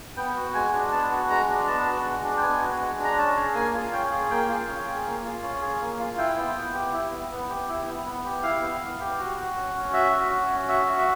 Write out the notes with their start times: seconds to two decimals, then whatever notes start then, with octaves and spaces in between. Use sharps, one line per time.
0.17 B3 G5
0.36 F#4
0.54 G#3 G#5
0.74 D4
0.92 B3 A5
1.11 F#4
1.30 G#3 A#5
1.49 D4
1.67 B3 A5
1.86 F#4
2.05 G#3
2.24 D4
2.37 G5
2.42 B3 G#5
2.61 F#4
2.80 G#3
2.99 D4
3.04 A#5
3.17 C#4 A5
3.36 G#4
3.54 A#3 G#5
3.74 F4
3.93 C#4 G5
4.11 G#4
4.30 A#3 G5
4.49 F4
4.68 C#4
4.87 G#4
5.05 A#3
5.24 F4
5.43 C#4
5.61 G#4
5.81 A#3
5.99 F4
6.18 E4 G5
6.37 B3
6.56 B3
6.74 G4
6.93 E4
7.11 B3
7.31 B3
7.49 G4
7.68 E4
7.87 B3
8.06 B3
8.24 G4
8.43 E4 F5
8.62 B3
8.81 B3
9.00 G4
9.18 F#4
9.37 F#4
9.56 C#4
9.74 C#4
9.93 F#4 E5
10.12 F#4
10.31 C#4
10.50 C#4
10.68 F#4 E5
10.87 F#4
10.98 E5